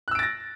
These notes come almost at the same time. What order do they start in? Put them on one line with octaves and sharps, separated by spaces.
F#6 E6 D7 A6 A#6